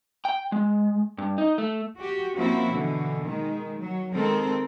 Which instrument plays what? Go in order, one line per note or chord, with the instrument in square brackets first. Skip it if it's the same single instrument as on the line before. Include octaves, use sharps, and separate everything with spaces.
[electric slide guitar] G5
G#3
G2
D#4
A3
[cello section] F#4 G4
F3 A#3 C4 C#4 E4 F#4
B2 D3 E3
D#3 G#3
F#3
D#3 G#3 C4 A4 A#4